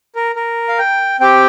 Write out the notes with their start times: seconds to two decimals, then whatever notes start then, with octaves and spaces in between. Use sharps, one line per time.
0.15 A#4
0.36 A#4
0.68 F5
0.79 G5
1.20 C4 G4 G5